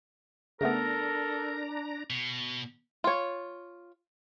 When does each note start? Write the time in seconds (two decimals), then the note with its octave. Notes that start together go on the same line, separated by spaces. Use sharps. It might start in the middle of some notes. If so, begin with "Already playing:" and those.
0.61 C#3 A3 B3 D4 A4 A#4 A#5
2.10 B2
3.04 F4 C#5